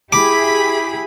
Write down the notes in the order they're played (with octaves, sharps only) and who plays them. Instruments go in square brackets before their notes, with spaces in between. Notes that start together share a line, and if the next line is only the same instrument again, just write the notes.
[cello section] E4 G4 G#4 [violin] B5 [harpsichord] D6